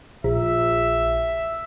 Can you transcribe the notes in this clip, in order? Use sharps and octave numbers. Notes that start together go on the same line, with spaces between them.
A#1 E5